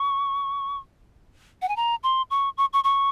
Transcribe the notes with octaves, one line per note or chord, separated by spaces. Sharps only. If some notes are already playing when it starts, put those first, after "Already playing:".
Already playing: C#6
F#5
G#5
A#5
C6
C#6
C#6
C#6
C#6